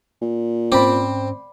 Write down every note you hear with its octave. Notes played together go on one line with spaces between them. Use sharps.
A#2
G#2 C4 C#4 D5 B5 D6